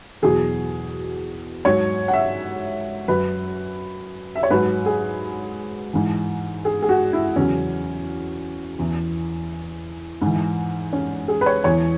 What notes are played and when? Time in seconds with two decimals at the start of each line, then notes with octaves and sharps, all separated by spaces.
0.22 E2 B2 F#3 G#4
1.65 G#2 F#3 C#5
2.08 F#5
2.13 E5
3.08 F#2 F#3 B4
4.35 E5
4.43 C#5
4.50 G#2 F#3 B4
4.86 G#4
5.93 G#2 E3
6.65 G#4
6.82 G#4
6.89 F#4
7.13 E4
7.36 E2 C#3 F#3 C#4
8.79 E2 E3
10.22 G#2 E3
10.93 C#4
11.28 G#4
11.41 B4
11.46 C#5
11.64 E2 E3 C#5